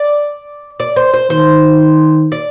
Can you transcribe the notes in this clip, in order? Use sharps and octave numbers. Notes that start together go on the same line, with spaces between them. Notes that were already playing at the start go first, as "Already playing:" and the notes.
Already playing: D5
D5
C5
C5
D#3 C5
D5